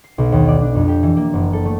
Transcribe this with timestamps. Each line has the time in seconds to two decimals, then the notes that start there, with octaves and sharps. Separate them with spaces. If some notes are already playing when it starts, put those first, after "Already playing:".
0.04 C7
0.18 B1
0.32 D#2
0.49 D5
0.61 D4
0.75 F2
0.88 G4
1.03 E3
1.17 A#3
1.33 F#1
1.53 A4
1.65 A3